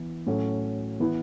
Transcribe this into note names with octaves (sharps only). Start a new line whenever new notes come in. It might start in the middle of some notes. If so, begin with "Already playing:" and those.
Already playing: E3 B3
A2 F#3 C#4 F#4 A4
E3 B3 E4